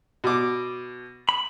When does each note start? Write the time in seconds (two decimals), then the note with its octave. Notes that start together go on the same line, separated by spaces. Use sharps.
0.24 B2 D6
1.29 B5